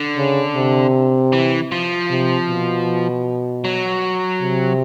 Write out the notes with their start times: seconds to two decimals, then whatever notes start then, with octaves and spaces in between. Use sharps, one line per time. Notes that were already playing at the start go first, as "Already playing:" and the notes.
Already playing: D3
0.17 C#3
0.56 C3
1.33 E3
1.72 F3
2.10 C3
2.48 B2
3.64 F#3
4.41 C3